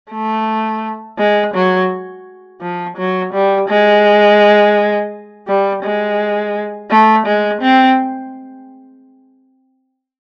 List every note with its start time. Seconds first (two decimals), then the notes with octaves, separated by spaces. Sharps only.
0.11 A3
1.18 G#3
1.54 F#3
2.62 F3
2.97 F#3
3.33 G3
3.68 G#3
5.48 G3
5.83 G#3
6.90 A3
7.26 G#3
7.62 C4